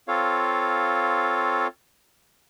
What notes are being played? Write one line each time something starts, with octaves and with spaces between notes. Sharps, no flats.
C4 F4 A4 C#5 F5